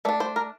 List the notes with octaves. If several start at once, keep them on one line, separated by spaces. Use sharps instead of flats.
A3 D4 D5
C5
A#4